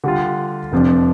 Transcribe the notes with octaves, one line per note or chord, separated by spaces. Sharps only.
D3 G3 F4
F1 F2 C3 F3 D4